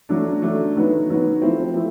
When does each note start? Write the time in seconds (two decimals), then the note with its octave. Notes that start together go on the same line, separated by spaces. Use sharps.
0.09 F#3 A3 D4
0.42 F#3 A3 D4
0.75 D#3 F#3 B3
1.09 D#3 F#3 B3
1.42 F3 A3 C4 E4
1.74 F3 A3 C4 E4